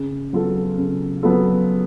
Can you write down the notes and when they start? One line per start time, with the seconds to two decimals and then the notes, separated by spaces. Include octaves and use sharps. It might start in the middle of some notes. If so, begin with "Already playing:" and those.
Already playing: C#3
0.33 F#3 B3 F4 A4
0.77 C#3
1.23 F#3 B3 F4 A4